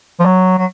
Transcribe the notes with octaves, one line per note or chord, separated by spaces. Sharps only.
F3
F#3
F#3